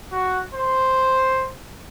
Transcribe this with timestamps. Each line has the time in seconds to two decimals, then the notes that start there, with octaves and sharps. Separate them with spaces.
0.12 F#4
0.54 C5